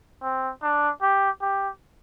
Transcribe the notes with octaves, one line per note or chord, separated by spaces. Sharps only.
C4
D4
G4
G4